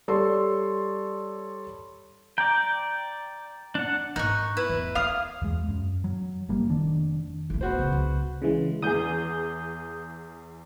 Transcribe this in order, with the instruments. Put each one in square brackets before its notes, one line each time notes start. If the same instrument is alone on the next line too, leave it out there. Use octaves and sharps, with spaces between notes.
[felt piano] G3 A4 C#5 D5 C6
[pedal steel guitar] D5 G5 [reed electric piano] A#5
[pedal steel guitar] D4 F#5
[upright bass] G#2 [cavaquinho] D#4 C#6 [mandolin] F#6
[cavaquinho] E4 B4
[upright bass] E2
[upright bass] C#4 [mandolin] F5 D#6
[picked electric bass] E2 G#3
F#2
F#3
F#1 G3 A#3
F1 D#3 D4
[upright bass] D1 A3
[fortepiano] B3 F#4 C5
[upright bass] C#3
C#2
[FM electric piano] C#3 E3 G#3
[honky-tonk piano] E2 G#4 [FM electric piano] D#6 G6